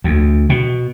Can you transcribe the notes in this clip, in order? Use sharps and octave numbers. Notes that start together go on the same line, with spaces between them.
D2
B2